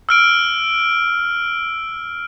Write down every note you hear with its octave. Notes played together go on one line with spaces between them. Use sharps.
E6 F6 D7